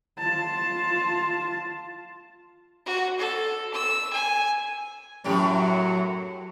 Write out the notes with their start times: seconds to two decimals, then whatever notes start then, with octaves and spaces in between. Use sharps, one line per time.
0.18 F4 A5
2.86 F#4
3.19 A4
3.74 E6
4.13 G#5
5.24 F#2 A2 F#3 G4